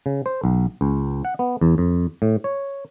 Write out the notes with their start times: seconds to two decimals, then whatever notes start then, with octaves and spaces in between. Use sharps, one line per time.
0.06 C#3
0.26 C5
0.44 B1
0.81 C#2
1.25 F#5
1.39 B3
1.61 E2
1.78 F2
2.22 A2
2.44 C#5